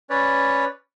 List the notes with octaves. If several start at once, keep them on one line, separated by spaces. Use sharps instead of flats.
C#4 B4 C#5 D5